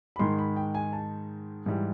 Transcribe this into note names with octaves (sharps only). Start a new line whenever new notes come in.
B5
G#2 D#3 G#3 C6
B5
G5
G#5
A5
G#2 E3 G3